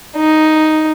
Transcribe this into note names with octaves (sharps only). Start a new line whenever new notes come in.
D#4